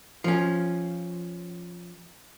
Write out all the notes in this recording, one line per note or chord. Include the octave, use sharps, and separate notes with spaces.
F3 C#4